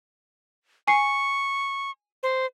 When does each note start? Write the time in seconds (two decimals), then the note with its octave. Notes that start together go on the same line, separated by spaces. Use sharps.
0.88 G#5 C#6 C7
2.23 C5